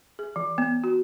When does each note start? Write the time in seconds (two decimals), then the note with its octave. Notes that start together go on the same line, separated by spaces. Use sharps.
0.19 G#4
0.36 E3
0.58 B3
0.84 F#4